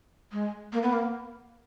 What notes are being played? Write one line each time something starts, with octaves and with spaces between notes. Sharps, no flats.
G#3
A#3
B3
A#3